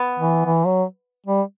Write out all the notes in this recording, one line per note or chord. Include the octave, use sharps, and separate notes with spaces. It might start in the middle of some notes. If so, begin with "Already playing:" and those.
Already playing: B3
E3
E3
F#3
G3